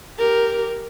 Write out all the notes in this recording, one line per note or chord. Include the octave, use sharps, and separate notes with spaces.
G4 A#4